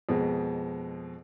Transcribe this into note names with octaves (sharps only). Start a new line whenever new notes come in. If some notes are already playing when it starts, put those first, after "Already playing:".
F2 B2 G#3